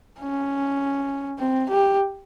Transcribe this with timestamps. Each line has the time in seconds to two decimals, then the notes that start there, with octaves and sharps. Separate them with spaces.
0.20 C#4
1.39 C4
1.69 G4